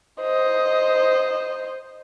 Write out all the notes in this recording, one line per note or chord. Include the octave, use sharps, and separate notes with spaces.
C5 D#5